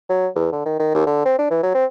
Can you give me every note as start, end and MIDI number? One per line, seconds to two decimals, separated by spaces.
0.09 0.28 54
0.36 0.48 40
0.52 0.61 50
0.66 0.76 51
0.80 0.91 51
0.95 1.06 39
1.07 1.22 50
1.26 1.35 60
1.39 1.48 62
1.51 1.61 52
1.63 1.75 54
1.75 1.85 60